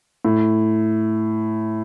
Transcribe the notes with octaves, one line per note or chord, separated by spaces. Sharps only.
A2